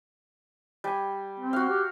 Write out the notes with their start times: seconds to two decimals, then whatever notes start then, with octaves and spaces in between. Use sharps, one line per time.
0.84 G3 G#5
1.40 C4
1.53 F#4 F5
1.69 G4